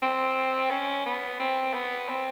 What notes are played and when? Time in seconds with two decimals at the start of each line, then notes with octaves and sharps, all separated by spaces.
0.02 C4
0.71 C#4
1.06 B3
1.40 C4
1.74 B3
2.09 C4